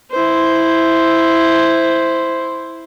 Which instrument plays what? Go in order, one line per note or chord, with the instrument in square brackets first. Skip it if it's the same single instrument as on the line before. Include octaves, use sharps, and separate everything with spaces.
[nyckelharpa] E4 C5